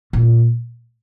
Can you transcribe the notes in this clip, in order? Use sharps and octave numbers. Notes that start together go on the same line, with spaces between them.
A#2